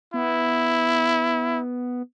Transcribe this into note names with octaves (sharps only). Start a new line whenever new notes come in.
B3 E4